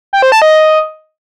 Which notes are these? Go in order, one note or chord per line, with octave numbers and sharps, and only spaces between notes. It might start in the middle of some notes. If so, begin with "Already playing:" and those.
G5
C5
A5
D#5